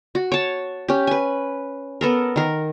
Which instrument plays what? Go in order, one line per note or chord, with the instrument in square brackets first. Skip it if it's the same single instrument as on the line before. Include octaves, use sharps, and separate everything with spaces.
[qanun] F#4
C#5 A5
C#4 G4
B4 G#5
B3 A4 A#4
D#3 A#4